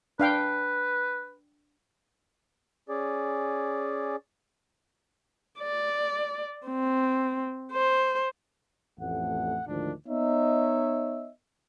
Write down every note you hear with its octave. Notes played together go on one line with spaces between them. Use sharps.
D4 B4 F5 G5
C#4 G#4 D5
D5
C4
C5
A1 F2 A3 F#5
D2 G#2 D#3 F3 D4
B3 D#4 C#5 D#5 E5